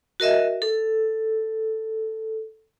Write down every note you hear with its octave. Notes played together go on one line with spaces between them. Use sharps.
F#4 A#4 D#5 E5
A4